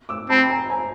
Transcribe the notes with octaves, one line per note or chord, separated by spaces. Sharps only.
D6 E6
C4 A5 B5
G#5 A#5
G#5 A#5